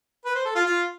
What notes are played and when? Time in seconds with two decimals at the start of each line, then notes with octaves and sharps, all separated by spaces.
0.25 B4
0.35 C5
0.45 A4
0.55 F4
0.65 F4